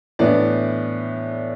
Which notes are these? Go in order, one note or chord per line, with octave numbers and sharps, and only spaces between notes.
A2 E3 B3 D4 D5